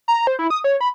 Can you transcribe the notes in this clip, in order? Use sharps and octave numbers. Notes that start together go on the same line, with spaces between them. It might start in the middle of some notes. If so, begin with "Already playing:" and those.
A#5
C5
E4
D#6
C#5
B5